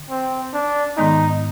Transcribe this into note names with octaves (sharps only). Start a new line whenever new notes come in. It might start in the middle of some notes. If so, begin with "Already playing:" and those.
Already playing: D3
C4
D4
G#2 D#3 G#3 B3 D#4